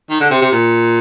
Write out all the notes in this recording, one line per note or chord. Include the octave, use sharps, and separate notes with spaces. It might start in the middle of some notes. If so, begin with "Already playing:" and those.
D#3
D3
C3
C3
A#2